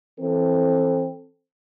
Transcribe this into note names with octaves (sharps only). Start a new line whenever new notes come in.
E3 C4 A4